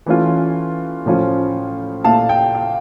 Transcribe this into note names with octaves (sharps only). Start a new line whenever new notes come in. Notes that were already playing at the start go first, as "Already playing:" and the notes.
E3 A3 C#4 F4
A2 F3 C#4 F4
A#2 A3 E4 F5 A5
G5
F5